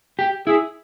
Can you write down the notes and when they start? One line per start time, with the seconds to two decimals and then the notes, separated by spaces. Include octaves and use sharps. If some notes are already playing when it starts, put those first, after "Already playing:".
0.19 G4
0.47 E4 G#4